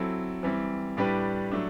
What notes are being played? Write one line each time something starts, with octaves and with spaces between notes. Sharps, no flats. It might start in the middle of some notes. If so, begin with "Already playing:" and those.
Already playing: F#3 C4 E4 A4
E3 G3 C4
A2 G3 D4 G4 B4
F#3 A3 D4